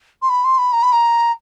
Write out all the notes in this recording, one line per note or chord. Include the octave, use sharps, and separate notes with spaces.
C6
B5
C6
B5
A#5
B5
A#5